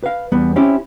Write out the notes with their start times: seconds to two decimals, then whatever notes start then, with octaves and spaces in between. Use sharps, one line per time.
0.03 B4 F5
0.32 E2 G3 B3
0.56 C4 C#4 E4 G4